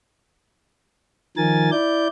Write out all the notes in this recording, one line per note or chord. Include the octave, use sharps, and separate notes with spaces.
D#3 F3 A#4 G#5 A6
E4 D5 G6